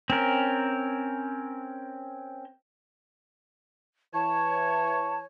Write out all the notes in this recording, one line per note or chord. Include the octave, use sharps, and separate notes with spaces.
C4 C#4 A#4
E3 C#5 A5